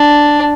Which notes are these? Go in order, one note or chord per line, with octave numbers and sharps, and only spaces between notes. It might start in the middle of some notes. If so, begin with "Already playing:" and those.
Already playing: D4